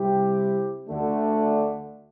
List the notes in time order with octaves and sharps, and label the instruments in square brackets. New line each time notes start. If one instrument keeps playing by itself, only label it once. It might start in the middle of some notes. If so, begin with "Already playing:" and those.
Already playing: [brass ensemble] C3 G3 C4 E4 G4
D2 D3 A3 D4